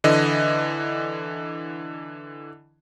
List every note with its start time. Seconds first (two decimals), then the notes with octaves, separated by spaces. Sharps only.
0.04 D3 E3 D#5